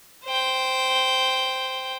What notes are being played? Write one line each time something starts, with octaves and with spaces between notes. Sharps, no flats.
C5 G5